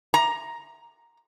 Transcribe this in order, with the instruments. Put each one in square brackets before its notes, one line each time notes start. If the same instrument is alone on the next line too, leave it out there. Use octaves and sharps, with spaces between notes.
[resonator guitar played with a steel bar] A#5